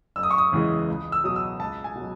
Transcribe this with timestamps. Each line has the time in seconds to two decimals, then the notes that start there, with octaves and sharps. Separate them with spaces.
0.16 F#1 E6
0.23 D#6
0.31 C#6
0.38 D#6
0.52 E2 C#3 E3 G#3
0.88 C#2
1.12 E6
1.24 B2 F#3 D#6
1.36 E6
1.60 C#2 A5
1.84 G#5
1.95 B2 F#3